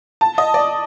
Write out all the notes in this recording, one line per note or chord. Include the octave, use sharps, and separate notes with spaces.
A5
D#5
D5